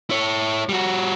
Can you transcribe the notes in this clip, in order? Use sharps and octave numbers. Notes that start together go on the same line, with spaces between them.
E4 C#5
G3 F#4